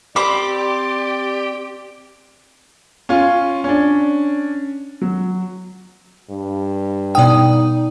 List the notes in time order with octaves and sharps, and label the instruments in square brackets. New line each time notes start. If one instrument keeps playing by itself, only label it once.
[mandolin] C4 B5 D6 [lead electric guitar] G4 [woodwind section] D5
[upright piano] C#4 F4
C#4 D4
F#3
[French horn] G2
[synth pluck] B2 D#6 [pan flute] D#4 [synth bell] D5 G5